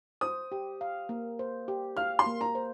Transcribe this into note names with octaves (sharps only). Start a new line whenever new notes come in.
C5 D#6
G4
F5
A#3
C5
G4
F5 F6
C6
A#3
A#5
C5